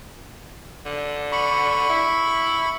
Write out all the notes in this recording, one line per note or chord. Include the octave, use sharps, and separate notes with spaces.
D3
B5 C#6
E4